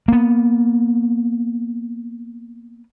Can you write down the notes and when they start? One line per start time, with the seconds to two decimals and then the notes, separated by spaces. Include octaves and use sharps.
0.08 A#3 B3